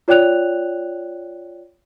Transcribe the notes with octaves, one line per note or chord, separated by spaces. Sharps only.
F4 C#5 D5 G5 F#6 F7